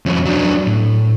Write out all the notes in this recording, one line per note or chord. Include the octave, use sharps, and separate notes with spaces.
F2 C#4
F#3 D4
A2